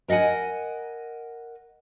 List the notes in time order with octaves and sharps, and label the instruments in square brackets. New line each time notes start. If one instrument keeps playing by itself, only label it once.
[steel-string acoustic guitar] A#4 D#5 F5 F#5 G#5